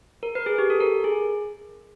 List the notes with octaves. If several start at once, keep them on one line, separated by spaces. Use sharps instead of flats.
A#4
B4
G#4
G4
A4
A#4
G#4